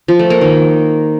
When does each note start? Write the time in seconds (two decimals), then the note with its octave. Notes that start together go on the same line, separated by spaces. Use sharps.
0.08 F3
0.19 A3
0.30 A#3
0.41 D#3